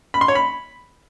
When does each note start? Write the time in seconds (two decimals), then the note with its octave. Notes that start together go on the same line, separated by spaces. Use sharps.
0.14 B5
0.21 C6
0.28 C#5
0.35 B5